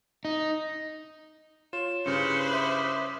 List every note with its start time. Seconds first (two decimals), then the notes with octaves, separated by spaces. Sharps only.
0.25 D#4
1.73 F4 C#5 E7
2.06 G2 C#3 C#4 E4 B4 C5 C#7
2.51 E5 D6 D#6